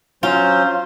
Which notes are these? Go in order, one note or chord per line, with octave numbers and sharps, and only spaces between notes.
F#3 C#4 F4 C5